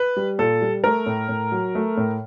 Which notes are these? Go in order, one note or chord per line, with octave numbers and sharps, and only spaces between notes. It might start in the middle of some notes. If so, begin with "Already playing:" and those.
Already playing: B4
G3
A#2 A4
G3
A3 A#4
A2
A2
F#3
A3
A2